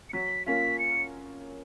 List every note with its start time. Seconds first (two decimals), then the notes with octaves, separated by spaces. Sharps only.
0.09 C#7
0.13 F#3 B6
0.46 A#3 C#4 F4 B6
0.79 C#7